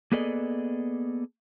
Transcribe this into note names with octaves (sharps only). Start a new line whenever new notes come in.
A#3 B3 G#4 A4 D5 D#5